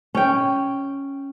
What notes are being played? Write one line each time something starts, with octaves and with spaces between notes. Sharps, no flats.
C#4 G5